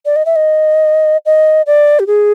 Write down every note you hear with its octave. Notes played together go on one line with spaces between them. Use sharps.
D5
D#5
E5
D#5
D#5
D5
G4
G#4